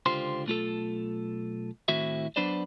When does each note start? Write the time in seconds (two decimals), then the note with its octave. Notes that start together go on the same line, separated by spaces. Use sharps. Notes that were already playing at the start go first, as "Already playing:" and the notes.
0.06 C#2 D3 F4 G4 C5 C6
0.46 B1 A3 F4 A4
1.88 A2 D#3 C4 E4 F#4 E5
2.36 F#3 B3 D4 B4 C5 D5